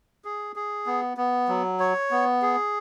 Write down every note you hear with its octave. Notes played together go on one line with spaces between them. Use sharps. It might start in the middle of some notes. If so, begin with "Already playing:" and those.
G#4
G#4
B3
B3
F#3
C#5
B3
G#4